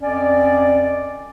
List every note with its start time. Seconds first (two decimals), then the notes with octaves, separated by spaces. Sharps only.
0.02 F2 C#4 D5